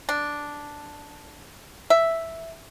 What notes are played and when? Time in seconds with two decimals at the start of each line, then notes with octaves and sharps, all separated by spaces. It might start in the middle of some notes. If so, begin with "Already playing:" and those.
0.09 D4
1.90 E5